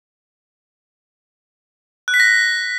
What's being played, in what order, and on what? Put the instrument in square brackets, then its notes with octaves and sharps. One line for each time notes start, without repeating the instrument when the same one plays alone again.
[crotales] F#6
B6
A#6